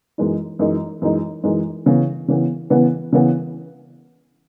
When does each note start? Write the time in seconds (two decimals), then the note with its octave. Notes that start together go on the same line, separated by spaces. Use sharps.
0.18 F#2 E3 G#3 D#4
0.59 F#2 E3 G#3 D#4
1.02 F#2 E3 G#3 D#4
1.43 F#2 E3 G#3 D#4
1.86 C#3 E3 B3
2.28 C#3 E3 B3
2.70 C#3 E3 B3
3.13 C#3 E3 B3